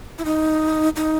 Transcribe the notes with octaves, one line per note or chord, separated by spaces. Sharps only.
E4
D#4
D#4